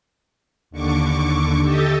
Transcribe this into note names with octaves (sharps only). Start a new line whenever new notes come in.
D#2 D3 C#6 D6
G4 A4 D#5 E5 A5